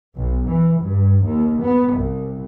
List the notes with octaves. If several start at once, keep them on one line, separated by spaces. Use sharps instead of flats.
B1
E3
G2
D#2
B3
C2